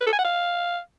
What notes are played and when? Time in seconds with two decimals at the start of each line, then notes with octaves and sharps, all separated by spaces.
0.01 B4
0.07 A4
0.13 G#5
0.19 F#5
0.25 F5